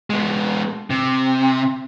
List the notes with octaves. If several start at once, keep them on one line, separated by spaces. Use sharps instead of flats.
G#3 B3
C3